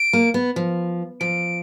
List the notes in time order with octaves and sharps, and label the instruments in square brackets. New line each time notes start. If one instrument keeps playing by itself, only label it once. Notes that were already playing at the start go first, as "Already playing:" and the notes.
Already playing: [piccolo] D7
[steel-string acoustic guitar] A#3
B3
F3
[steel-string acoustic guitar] F3 [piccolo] D7